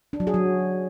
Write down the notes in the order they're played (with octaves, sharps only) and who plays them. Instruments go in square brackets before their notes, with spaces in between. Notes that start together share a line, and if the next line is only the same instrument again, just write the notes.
[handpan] D4
F#3
G#4
F#3